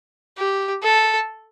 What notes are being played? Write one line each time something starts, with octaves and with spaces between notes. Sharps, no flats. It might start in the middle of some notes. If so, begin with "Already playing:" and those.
G4
A4